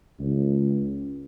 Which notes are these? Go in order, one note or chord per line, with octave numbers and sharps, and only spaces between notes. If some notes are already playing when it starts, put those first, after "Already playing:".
C#2